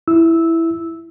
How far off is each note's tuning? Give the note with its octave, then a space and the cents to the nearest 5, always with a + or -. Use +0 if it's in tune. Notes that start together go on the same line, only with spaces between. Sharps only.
E4 +0 E6 -10